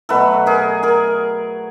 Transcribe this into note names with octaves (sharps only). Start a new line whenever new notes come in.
B2 F#3 A3 A4 B4
G#4 A#4
G#4 A#4